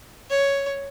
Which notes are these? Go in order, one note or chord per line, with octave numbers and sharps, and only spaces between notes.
C#5